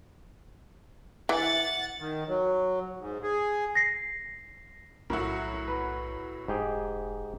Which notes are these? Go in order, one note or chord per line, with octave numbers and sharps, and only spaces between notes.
E3 F#5 A6
D#3
F#3
G#2
G#4
A#6 C7
B1 A2 F#3 F#4 A#4 E5
B4
E1 G#2 G4 G#4